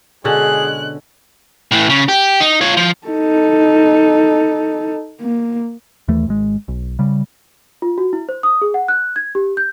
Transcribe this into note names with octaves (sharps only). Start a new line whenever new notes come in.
B2 D3 G#3 C#4 G#4 F#6
A2 E3
C#3
G4
D#4
F4 C#5
F3
D#4 A4
A#3
D#2 E3 A3
G#1 G#3
B1
C#3 G3
F4
F#4
E4
C5
D#6
G#4
F#5
F#6
G#6
G4
G6